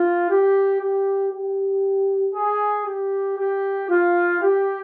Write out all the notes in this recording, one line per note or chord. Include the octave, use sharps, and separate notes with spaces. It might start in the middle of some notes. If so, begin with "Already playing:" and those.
Already playing: F4
G4
G4
G4
G#4
G4
G4
F4
G4